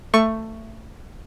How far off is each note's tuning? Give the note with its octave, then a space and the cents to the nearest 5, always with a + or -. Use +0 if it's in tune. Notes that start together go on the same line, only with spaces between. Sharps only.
A3 +15 C#6 +0